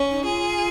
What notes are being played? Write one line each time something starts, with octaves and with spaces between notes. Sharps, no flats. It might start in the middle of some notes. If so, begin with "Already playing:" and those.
Already playing: C#4
D#4
F4 G#4